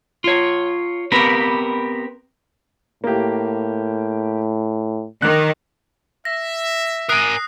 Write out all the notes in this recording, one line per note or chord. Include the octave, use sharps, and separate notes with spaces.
F4 C#5
B3 C4 G4 A#4 B4
A2 A#3 G4
D#3 D6 F#6
E5 A#6
A#4 G#5 D#6 F#6 C7